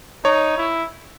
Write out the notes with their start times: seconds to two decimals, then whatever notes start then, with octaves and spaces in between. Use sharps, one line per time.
0.24 D#4 C#5
0.57 E4